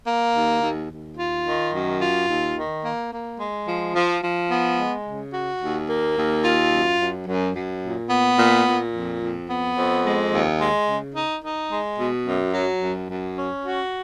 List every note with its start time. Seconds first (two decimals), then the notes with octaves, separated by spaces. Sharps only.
0.07 A#3
0.35 D#2
0.62 D#2
0.90 D#2
1.18 F4
1.45 D#3
1.73 F#2
2.01 F4
2.29 D#2
2.56 D#3
2.84 A#3
3.12 A#3
3.39 G#3
3.67 F3
3.95 F3
4.22 F3
4.50 B3
4.78 G#3
5.06 C#3
5.33 F#4
5.61 D#2
5.89 A#3
6.17 D#2
6.44 F4
6.72 F#2
6.99 F#2
7.27 F#2
7.55 F#2
7.83 A#2
8.10 B3
8.38 A#2
8.66 A#2
8.93 F2
9.21 F2
9.49 B3
9.76 F2
10.04 G#3
10.32 D#2
10.60 G#3
10.87 C#3
11.15 D#4
11.43 D#4
11.70 G#3
11.98 B2
12.26 F#2
12.53 F#3
12.81 F#2
13.09 F#2
13.37 C#4
13.65 F#4